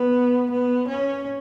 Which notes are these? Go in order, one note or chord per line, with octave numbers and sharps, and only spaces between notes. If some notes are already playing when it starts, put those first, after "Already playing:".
Already playing: B3
B3
C#4